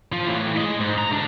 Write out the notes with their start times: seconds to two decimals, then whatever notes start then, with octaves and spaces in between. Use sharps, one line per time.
0.12 F3 F4
0.27 A2 E3
0.58 G#3 D#5
0.80 G#2
0.98 A#5
1.12 D2 D4